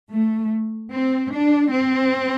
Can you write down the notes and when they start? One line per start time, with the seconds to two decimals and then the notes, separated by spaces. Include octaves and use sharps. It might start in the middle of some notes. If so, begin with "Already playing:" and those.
0.11 A3
0.92 C4
1.32 D4
1.72 C4